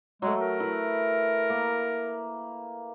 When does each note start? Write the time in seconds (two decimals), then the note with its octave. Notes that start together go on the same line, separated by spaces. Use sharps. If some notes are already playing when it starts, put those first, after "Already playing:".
0.22 F#3 G#3 A3
0.41 A#4
0.60 E4 B4
1.50 A#3